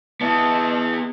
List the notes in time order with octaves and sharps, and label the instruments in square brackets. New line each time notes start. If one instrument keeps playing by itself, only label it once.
[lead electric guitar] B3 E4 [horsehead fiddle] D#5 A5